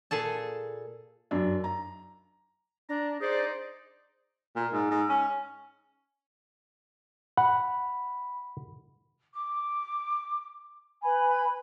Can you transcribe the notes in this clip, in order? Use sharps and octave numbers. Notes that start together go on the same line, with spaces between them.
A#2 G#4 A4 A5
F#2 D4
A#5
D4 A#5
D#4 G#4 C5 D5
A#2
G#2
G#2
C#4
F#5 B5
D6
B4 G#5 B5